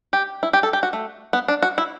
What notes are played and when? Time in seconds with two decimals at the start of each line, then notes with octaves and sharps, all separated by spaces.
0.13 G4
0.43 E4
0.53 G4
0.63 A4
0.73 G4
0.83 F#4
0.93 A3
1.33 B3
1.48 D4
1.63 F#4
1.78 E4